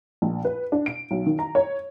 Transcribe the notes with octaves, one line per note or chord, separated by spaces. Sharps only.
A#1
B4
D4
D7
B1
D#3
A#5
C#5